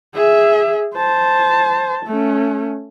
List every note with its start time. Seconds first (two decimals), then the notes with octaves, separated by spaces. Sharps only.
0.14 G#4 E5
0.96 C5 A5
2.06 A3 C#4